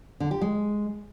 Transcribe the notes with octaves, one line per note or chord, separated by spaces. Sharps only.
D3
G4
G#3